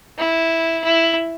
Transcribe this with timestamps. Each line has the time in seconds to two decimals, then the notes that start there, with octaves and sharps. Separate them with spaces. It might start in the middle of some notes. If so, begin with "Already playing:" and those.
0.18 E4
0.84 E4